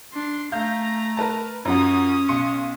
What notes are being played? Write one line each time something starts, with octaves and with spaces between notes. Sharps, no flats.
D4 C6
A3 F5 A#5 G6
A#4 B4 A5
F#2 F3 C#4 F#4 D#6
B1 C6 C#7